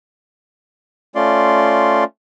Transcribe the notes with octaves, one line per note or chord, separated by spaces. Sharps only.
A3 C#4 F4 D5 C6